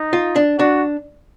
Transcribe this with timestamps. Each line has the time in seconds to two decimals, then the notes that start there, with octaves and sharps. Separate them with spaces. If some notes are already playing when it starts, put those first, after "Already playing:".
Already playing: D#4
0.13 F4
0.36 D4
0.59 D4 F#4